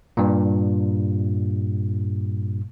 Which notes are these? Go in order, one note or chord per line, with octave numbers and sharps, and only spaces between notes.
G2 A#2